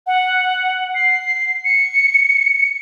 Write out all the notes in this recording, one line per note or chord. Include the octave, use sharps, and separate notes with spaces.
F#5
C7
C#7